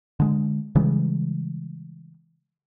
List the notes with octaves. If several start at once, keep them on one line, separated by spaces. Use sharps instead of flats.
D3 G#3
C#3 E3 G3 G#3